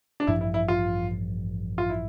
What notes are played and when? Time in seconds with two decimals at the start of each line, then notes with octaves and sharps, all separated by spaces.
0.20 D4
0.27 A1 G2 F3 E4
0.41 E4
0.54 E4
0.68 F4
1.78 F4
1.90 E4